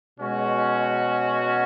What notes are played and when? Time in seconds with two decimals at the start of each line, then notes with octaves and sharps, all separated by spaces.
0.19 B2 G#3 C#4 F#4